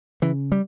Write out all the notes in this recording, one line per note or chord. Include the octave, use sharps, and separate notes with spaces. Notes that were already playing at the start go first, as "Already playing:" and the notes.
C#3 E3
G3